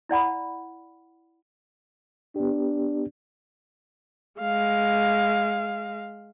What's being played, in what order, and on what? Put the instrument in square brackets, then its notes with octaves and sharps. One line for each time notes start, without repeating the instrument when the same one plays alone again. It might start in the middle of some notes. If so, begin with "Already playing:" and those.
[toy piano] E4 D5 F#5 B5
[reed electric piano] B3 G4 [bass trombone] D4
[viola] G#3 F5